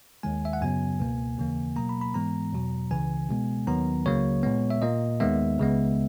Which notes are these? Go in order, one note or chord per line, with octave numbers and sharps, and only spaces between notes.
D#2 D#3 G#3 G#5
E5
F#5
F#2 C#3 F#3 B3 G#5
C#2 B2 A#3
D#2 C#3 E3 A#3
B2 F#3 A#3 A#5
B5
B5
G#2 E3 G#3 B3 A#5
E2 B2 F#3
C#2 C#3 E3 G#5
B2 G#3 B3
D#2 D#3 F#3 B3 A#5
C#2 C#3 F#3 A#3 C#5
A#2 G#3 B3
E5
A#2 A#3 D#5
D#2 D#3 G#3 B3 E5
C#2 C#3 G#3 B3